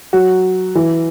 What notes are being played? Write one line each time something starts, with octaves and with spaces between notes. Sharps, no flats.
F#3 F#4
E3 E4